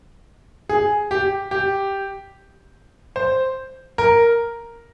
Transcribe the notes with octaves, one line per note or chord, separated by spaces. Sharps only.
G#4
G4
G4
C5
A#4